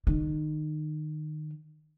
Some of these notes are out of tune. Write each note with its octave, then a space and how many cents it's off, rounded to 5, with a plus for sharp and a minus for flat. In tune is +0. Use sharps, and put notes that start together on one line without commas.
D#3 -25